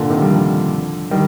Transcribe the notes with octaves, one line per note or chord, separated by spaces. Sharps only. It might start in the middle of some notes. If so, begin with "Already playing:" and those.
Already playing: A#2 D3
C3 D#3
G3
D3 F3
D#3 G3